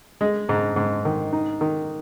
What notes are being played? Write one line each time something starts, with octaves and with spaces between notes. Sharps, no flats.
G#3
G#2
G#2
D#3
D#4
D#3